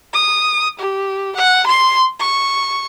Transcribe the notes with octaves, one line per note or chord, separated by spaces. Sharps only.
D#6
G4
F#5
C6
C#6